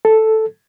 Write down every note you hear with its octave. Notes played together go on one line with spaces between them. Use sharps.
A4